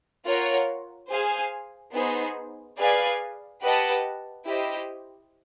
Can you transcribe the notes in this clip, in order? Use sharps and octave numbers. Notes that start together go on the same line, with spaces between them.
F4 A#4 C#5 F#5
G#4 C5 F5 G#5
B3 D#4 G#4 C5
G#4 B4 D5 F5 G#5
G4 B4 D#5 F#5 A5
E4 G4 C5 D#5